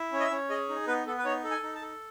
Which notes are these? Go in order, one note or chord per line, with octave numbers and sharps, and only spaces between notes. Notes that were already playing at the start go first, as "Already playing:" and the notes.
Already playing: E4
C#4
D#5
E5
C#4
G#4 D#5
D#4
B3 B4
B3 A4
B4
D#4 C#5
A4
G#5
D#4
A5
A4